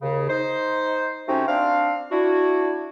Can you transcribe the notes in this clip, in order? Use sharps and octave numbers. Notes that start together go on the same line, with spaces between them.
D#2 C#3
D#4 C5
C3 A3 C4 C#4 D#4 F#4
C4 D4 F5
D4 E4 F#4